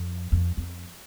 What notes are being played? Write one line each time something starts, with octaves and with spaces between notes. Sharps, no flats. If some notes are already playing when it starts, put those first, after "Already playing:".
Already playing: F2
F2
F2